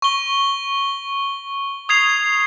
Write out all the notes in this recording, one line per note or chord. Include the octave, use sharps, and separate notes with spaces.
C#6 G7
D#6 G#6 C7 F7